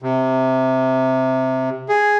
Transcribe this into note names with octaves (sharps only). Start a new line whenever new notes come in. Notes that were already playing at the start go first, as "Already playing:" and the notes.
C3
G#4